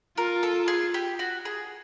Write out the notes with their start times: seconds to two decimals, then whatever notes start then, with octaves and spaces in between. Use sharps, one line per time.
0.18 F4 A#4
0.43 A4
0.68 G#4
0.94 G4
1.19 F#4
1.45 G#4